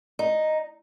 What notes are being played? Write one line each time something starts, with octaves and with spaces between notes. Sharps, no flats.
D#4